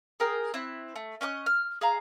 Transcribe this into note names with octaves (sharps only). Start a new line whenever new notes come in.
G#4 A#4 G5 D#6
C4 E4 F#6
A3
C#4 D#5 D6 F#6
F6
G#4 F5 A#5